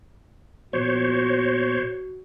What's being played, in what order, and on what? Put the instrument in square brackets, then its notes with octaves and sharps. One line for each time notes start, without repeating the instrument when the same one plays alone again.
[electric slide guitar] A#2 F3 B3 [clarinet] F#4 [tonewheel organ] C5 C#5